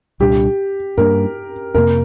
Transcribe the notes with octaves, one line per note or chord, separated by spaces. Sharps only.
C2 A#2 G3 D4 G4
G2 G3 A#3 D4 A#4
F2 C3 A#3 A#4